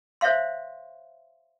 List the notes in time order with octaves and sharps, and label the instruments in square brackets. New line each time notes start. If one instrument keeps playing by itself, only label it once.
[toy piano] C5 C#5 E5 F5 C6